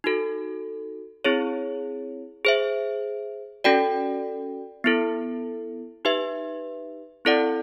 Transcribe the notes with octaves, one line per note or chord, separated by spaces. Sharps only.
D#4 F#4 A4
C4 E4 G#4 C#5
G#4 C5 E5
C#4 F#4 A4 D5 G5
B3 E4 A4
D#4 G4 B4 E5
C4 E4 A4 D5 F#5